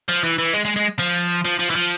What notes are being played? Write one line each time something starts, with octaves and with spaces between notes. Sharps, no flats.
F3
E3
E3
G#3
G#3
G#3
F3
F3
F3
E3
F3